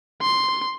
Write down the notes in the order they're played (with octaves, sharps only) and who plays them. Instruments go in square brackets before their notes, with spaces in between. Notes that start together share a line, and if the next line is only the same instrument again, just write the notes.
[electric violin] C6